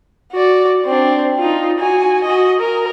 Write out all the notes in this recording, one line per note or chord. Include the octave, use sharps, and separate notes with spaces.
F#4 D5
C4 D4
D#4 F4
F#4 G#5
F#4 D#5
A#4